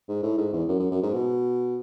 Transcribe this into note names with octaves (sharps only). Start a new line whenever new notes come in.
G#2
A2
G#2
E2
F#2
F#2
F#2
G#2
B2